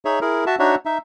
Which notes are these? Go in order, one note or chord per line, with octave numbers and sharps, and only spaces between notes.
D#4 G#4 C#5 E5
E4 G#4 A#4
F#4 E5 A5
D4 D#4 F#4 C#5 E5
D#4 E5